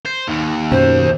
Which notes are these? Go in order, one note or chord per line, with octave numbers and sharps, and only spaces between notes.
C5
D#2
F#2 B2 C#4 C5